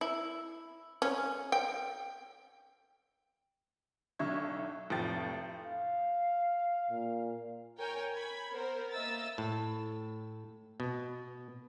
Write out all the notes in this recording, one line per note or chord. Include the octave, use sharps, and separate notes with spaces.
E4
C#4
G5
B1 D3 D#4 E5 C#6 G#6
F1 A2 F3 G5 A6
F5
A#2
A#4 C#5 G5 G#5
B5 G#6
B3 A#4 C5
A#3 D#5 E5 E6 A6
A2
B2